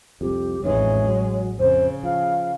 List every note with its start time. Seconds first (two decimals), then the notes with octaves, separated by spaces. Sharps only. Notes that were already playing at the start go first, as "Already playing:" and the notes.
0.21 C2 F2 G4
0.63 A1 F2 G#2 E3 G#3 C#5
1.08 F#3
1.59 F2 C#3 C5
2.03 F3 F5